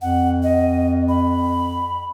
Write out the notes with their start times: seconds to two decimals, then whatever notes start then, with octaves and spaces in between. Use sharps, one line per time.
0.02 F2 F#5
0.43 D#5
1.09 B5